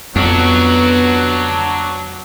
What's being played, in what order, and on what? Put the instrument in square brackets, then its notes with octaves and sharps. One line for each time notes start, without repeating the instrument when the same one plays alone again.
[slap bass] F2 [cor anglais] F#3 [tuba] B3 [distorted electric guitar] D4 F#4